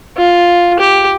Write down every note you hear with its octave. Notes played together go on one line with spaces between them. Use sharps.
F4
G4